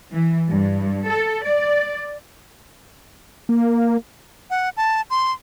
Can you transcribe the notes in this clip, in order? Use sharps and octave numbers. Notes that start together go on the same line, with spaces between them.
E3
G2
A4
D5
A#3
F#5
A5
C6